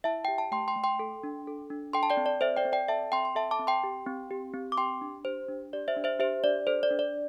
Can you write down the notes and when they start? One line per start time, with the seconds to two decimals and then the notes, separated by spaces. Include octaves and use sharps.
0.04 E4 E5 A5
0.25 G4 G5
0.38 A5
0.51 A3 G5 C6
0.68 G5 C6
0.76 A3
0.84 G5 C6
0.99 A4
1.23 D4
1.47 A4
1.70 D4
1.93 A4 G5 C6
2.03 A5
2.10 D5 G5
2.17 C4
2.26 D5
2.41 A4 C5 E5
2.57 D5 G5
2.65 C4
2.72 D5 G5
2.88 A4 E5 A5
3.12 C4 G5 C6
3.25 C6
3.35 A4 E5 A5
3.51 A5 D6
3.59 C4
3.67 G5 C6
3.84 G4
4.06 C4
4.31 G4
4.54 C4
4.72 D6
4.77 G4 G5 C6
5.01 D4
5.25 G4 C5
5.48 D4
5.73 G4 D5
5.88 C5 E5
5.96 D4
6.04 C5 E5
6.19 G4 C5 E5
6.43 D4 D5
6.67 A4 C5
6.83 D5
6.91 D4
6.99 D5